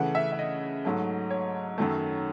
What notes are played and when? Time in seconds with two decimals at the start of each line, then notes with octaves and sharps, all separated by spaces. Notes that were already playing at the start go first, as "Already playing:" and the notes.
Already playing: C#3 E3 A3 F#5
0.15 E5
0.32 E5
0.39 D#5
0.85 G#2 F#3 A3
1.30 C#5
1.78 F#2 D#3 F#3 A3